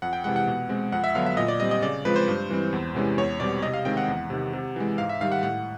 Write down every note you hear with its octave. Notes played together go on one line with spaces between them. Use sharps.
F2 F#5
G5
C3 E3 G#3 F#5
F#5
B2
G#3 C4
F2 F#5
E5
D3 F#3 B3 D4 F5
E5
A#2 D#5
D5
G3 C4 D#5
D#5
C#3 D5
F3 G#3 C4 B4
C5
G2
E3 G3 C4
E2
C3 E3 G#3 C#4
E2 C#5
B2 G3 C4 D5
C3 D#5
F5
D#3 G#3 C4 G5
F#5
E2
C3 D#3
C3
E3 G#3
G#2 F5
E5
D#3 G3 F5
F#5
A2 F#5